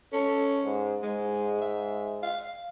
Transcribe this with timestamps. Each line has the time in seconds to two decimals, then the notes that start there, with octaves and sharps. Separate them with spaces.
0.13 C#4 A4
0.65 G#2
1.02 G#2 G#3
1.62 E5
2.23 F5